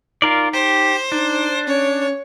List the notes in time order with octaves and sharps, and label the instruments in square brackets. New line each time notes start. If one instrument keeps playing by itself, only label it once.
[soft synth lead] D#4 [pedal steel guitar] F4 A#4 D5
[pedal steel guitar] G4 [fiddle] C5
[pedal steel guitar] D4 [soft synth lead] D#4
[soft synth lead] C#4 [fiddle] C#5